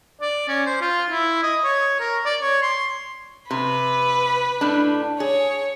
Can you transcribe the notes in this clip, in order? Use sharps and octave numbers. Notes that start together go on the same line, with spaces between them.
D5
C#4
C5
F4
E4
D#5
C#5
A#4
D5
C#5
C6
C3 B4
A2 D4
G#4 C#5